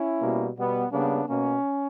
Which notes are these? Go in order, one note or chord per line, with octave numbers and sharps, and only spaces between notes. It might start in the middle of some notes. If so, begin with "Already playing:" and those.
Already playing: C#4 E4
B2 G3 A#3
B2 G3 B3
C#3 G3 A#3 B3 D4
B2 A#3 C#4